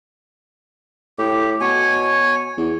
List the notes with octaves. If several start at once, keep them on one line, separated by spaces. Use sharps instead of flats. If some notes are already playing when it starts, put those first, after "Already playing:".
A2 G4
B2 C#5 G#5
E2